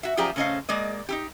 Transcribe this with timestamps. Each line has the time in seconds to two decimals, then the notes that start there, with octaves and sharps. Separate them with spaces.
0.03 F#4 E5
0.17 F#2 F3 G4 G#4 D5 A#5
0.36 C#3 A3 C#4 C5 D#5 F5
0.69 G#3 A#3 D5 D#5
1.09 D#4 E4 G4